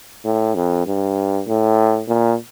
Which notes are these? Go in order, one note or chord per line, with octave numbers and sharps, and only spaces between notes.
A2
F2
G2
A2
A#2